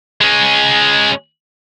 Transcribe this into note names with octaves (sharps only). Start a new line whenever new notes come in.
G#3 C#4